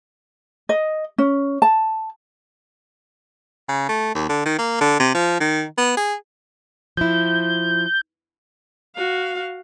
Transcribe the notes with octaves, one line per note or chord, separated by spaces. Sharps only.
D#5
C#4
A5
C#3
A3
D#2
D3
D#3
A#3
D3
C3
F3
D#3
B3
G#4
F3 E4 G6
F#4 F5